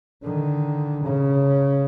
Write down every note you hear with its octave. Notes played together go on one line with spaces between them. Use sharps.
D3 D#3
C#3